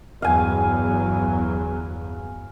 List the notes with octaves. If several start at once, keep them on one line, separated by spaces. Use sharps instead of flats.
G1 E2 F#3 F5 G#5